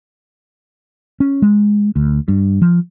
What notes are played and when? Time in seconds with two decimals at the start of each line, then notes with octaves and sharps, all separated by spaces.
1.20 C#4
1.42 G#3
1.96 D2
2.28 G2
2.62 F3